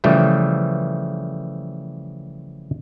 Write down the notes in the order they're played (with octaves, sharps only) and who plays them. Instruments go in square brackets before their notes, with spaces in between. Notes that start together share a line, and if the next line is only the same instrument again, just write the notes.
[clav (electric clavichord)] C#3 E3 F3 G3 A3